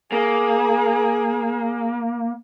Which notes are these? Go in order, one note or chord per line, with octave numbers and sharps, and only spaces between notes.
A#3 G#4